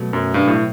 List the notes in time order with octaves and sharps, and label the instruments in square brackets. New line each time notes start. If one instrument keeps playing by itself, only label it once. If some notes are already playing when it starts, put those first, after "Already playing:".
Already playing: [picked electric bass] B2 F#3 A3
[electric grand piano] F#2
G2
A2